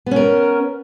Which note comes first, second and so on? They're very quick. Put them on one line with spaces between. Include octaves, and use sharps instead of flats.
B3 C#4 A#4